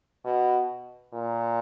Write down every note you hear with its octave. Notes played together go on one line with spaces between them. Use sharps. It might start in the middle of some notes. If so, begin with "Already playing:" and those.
B2
A#2